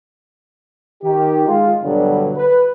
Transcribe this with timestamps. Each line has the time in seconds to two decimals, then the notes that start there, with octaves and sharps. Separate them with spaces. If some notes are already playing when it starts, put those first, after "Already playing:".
1.03 D#3 G4
1.46 G#3 F4
1.83 G2 B2 D3 F#3 G3 B3
2.36 B4